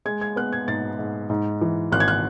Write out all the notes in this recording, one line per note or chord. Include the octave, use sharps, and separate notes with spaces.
G#3 G#6
G#6
B3 F#6
G#6
G#2 A6
G#2
G#2
E3
G#1 F#6
G#6
F#6